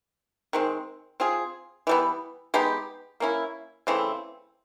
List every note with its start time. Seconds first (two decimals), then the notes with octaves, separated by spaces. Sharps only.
0.53 D#3 G#3 C4
1.20 C4 F4 G#4
1.87 E3 G3 B3
2.54 G#3 B3 D#4 G4
3.20 A#3 C#4 E4
3.87 C#3 E3 A3 C4